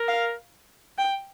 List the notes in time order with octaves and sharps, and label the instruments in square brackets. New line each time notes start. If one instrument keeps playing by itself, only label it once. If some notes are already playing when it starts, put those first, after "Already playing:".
Already playing: [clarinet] A#4
[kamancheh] F5
G5